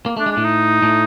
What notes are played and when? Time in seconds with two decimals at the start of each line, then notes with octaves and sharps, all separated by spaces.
0.06 A#3
0.17 A3 D4
0.26 G#3
0.32 D4
0.37 A2 A3
0.44 D#4
0.83 A2 A3